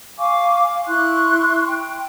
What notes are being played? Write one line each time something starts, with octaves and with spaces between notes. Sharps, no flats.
F5 G#5 C#6 D6
E4 C6 C#6 F#6
G5